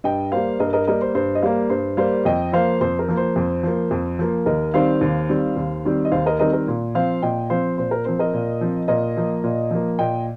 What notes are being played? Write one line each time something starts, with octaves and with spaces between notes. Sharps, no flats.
G2 D#5 G5
G3 A#3 C5 F5
G2 A#4 D#5
A#4 D#5
G3 A#3 A#4 D#5
C5
G2 C5
D#5
G3 A#3 C5 F5
G2 C5
G3 A#3 C5 F5
F2 D#5 G5
F3 A#3 C5 F5
F2 C5
A#4
F3 A#3
C5
F2
F3 A#3
F2
F3 A#3
D#2 A#4 D#5
D#3 G3 C4 C5 F5
D#2
D#3 G3 C4
D#2
D#3 G3 C4
D#5
D#2 C5 F5
A#4 D#5
D#3 G3 C4 A#4 D#5
A#4
A#2
F3 C4 C5 F5
A#2 D#5 G5
F3 C4 C5 F5
A#2 C5
A#4
F3 C4 C5
A#4 D#5
A#2
F3 C4
A#2 A#4 D#5
F3 A#3
A#2
F3 A#3
A#2 D#5 G5